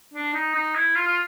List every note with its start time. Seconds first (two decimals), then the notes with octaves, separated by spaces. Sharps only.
0.13 D4
0.33 D#4
0.54 D#4
0.75 E4
0.95 F4
1.07 F4